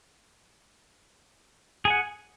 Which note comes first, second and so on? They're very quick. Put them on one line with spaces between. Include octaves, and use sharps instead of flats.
G#4 G#5 F#5